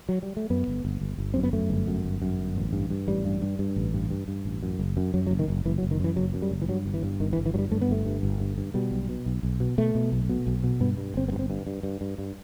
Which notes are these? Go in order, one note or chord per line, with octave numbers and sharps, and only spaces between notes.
F#3
G3
A3
F#2 B3
G1
G1
G1
G1
F#2 C4
B3
F#2 A3
G1
F#2
G1
F#2
G1
A1
G2
G2
A1 G3
G2
G2
G2
A1
G2
G2
G2
A1
F#2
F#1
F#2
F#2 F#3
F#3
F#1
D#3
F#1
F#1 E3
F#3
F#1
D#3
F#2 E3
F#1 F#3
F#2
G3
F#1
E3
G2 F#3
G1
E3
G2
G1 D#3
E3
G1
E3
G2 F#3 G3
G2 A3
B3
G1 A3
G2
G1
G2
G2
B2 G3
B1
B2
B1
B1
B2
B2 A3
B2
B1
B2
B1
B2
G2 B3
G2
G1 C4
B3
G2
C4
G2
G2
G2
G2
G2